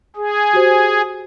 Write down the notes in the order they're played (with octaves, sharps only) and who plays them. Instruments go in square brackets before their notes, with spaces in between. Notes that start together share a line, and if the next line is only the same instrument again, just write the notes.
[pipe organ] G#4
[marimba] F#4 G4 C5